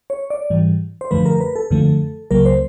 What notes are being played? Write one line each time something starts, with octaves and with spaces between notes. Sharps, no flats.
C#5
D5
G#2 E3 G3
C5
F#2 D3 F3 A3 B4
A#4
B4
A4
F#2 D3 F3 A3
C#2 C#3 F#3 A#3 A#4
C5